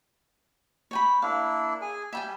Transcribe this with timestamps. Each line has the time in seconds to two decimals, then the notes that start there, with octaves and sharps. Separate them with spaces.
0.91 C#5 G5 B5
1.22 A#3 D4 E4 F5
1.82 G#4 G#5
2.13 G3 E5 G5 G#5